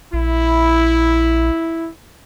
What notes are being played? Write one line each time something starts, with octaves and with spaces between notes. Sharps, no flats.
A#1 E4